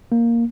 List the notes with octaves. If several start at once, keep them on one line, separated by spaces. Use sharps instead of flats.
A#3